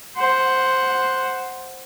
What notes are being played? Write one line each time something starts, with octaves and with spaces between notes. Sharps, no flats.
C5 F#5